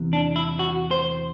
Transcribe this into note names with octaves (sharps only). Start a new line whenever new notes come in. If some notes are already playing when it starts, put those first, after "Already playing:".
Already playing: E2 C3 E3
D4
E4
F#4
C5